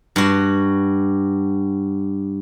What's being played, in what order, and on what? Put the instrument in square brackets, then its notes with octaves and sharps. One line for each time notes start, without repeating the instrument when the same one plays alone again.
[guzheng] G2 F#4